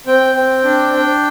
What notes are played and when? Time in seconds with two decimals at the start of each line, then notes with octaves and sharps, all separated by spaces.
0.07 C4 G5
0.36 C4
0.64 D4
0.93 D4